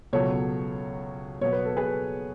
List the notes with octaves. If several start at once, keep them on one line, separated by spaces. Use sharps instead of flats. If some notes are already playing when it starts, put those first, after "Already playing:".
C#2 B2 F#3 A4 C#5
B2 F#3 B3 C#5
B4
A4
G#4 B4